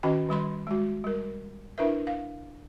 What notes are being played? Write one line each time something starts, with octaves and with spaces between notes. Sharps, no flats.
D#3 C#4 F#4 D#5 G5
D#3 G3 B5 C6
G#3 F#4
G3 A#4
D4 E4 A#4 B4 E5
F5